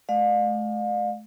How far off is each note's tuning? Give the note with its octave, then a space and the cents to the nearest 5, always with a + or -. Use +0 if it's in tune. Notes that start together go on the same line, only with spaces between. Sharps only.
A3 -40 D5 +45 F5 +35